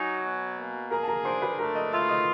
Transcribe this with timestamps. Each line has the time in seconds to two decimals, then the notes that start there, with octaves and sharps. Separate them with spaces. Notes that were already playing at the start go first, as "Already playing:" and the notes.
Already playing: F#3 D#4 G#5
0.24 B2
0.57 A#3
0.91 G#4 A#4 A#5
1.03 A5
1.08 A#4 A#5
1.25 D4 C5 C6
1.42 B4 B5
1.59 A3 A#4 A#5
1.75 D#5 D#6
1.93 F4 E5 E6
2.09 D#5 D#6